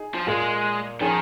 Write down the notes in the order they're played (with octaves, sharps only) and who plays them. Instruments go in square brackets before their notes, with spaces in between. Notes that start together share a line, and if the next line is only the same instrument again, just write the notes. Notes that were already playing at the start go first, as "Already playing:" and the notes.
Already playing: [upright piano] D#4 G#4
[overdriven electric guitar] F3
[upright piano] A#2 A#3 F4 G#4 [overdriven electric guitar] G#3
[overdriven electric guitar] D#3 [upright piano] F3 C#4 G#4 C#5